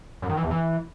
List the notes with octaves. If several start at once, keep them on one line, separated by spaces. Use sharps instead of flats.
F#2
D#3
E3
E2
E3